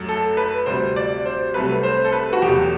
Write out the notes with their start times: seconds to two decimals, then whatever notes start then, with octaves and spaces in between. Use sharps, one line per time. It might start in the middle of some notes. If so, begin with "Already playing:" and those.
Already playing: F#2 F#3 A3
0.09 A4
0.37 B4
0.66 D2 C3 G3 C5
0.96 D5
1.26 C5
1.54 C2 C3 F#3 A3 B4
1.83 C5
2.05 A4
2.13 B4
2.33 F#4
2.42 E2 B2 F#3 A3 G4